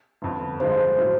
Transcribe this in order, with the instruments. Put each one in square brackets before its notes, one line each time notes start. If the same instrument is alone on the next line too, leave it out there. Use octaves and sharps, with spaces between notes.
[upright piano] G1 F2 D3
[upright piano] G2 D3 F3 G#3 [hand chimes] C5
[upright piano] A2 F#3 A3